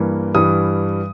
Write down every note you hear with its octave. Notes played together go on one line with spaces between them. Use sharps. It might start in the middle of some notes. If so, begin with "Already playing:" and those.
Already playing: G2 E3 A#3
G2 E3 G3 D#6